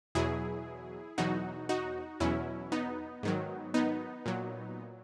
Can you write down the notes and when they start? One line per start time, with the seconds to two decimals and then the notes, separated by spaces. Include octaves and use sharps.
0.15 E2 B2 F#3 E4 G#4
1.18 E2 B2 F#3 D#4 F#4
1.69 D#4 F#4
2.20 E2 B2 F#3 C#4 E4
2.72 B3 D#4
3.23 G#2 D#3 F#3
3.74 B3 D#4
4.26 A#2 F#3